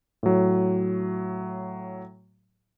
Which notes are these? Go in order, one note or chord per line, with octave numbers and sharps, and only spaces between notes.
A2 F#3